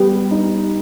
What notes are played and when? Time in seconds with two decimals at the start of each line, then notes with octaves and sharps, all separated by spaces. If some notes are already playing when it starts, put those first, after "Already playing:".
Already playing: G3 B3 G4
0.31 D#4